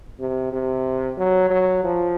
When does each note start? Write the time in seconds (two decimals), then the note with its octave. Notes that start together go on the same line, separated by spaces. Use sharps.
0.20 C3
0.53 C3
1.18 F#3
1.50 F#3
1.84 F3